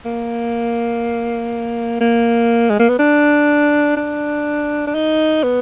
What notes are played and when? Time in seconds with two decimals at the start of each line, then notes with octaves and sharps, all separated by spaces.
0.06 A#3
2.01 A#3
2.70 G#3
2.80 A#3
2.90 B3
2.99 D4
3.97 D4
4.87 D4
4.95 D#4
5.44 B3